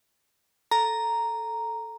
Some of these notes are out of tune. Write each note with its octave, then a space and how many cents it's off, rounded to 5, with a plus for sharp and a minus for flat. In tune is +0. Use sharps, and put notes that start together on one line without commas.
A4 +0 A#5 +0